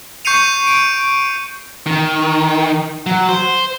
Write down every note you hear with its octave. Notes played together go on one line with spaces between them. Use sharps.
C#6 G6 C7 C#7 D#7 F7
D7
D#3
F#3
C5